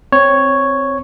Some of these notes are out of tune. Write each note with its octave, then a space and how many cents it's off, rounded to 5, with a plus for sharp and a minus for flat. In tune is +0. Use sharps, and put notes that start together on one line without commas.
C4 +0 C#5 +0